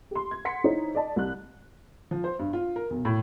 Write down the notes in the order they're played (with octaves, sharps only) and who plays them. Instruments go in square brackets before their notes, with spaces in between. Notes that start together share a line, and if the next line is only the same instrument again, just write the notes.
[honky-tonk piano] G4 C6
G#6
F#5 C6 B6 C#7
D#4 E4 C5 C#5
D5 D#5 A5
C2 F#6
[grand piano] F3
C5
G2
F4
A#4
B1
A2